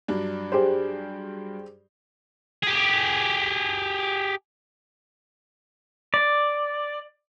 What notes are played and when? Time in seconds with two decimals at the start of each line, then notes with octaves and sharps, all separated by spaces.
0.08 G2 F#3 D4
0.52 G4 G#4 C5
2.63 G4 G#4
6.14 D5